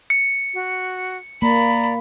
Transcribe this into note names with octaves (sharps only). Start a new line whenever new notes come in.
C#7
F#4
A#3 D5 A#5 B5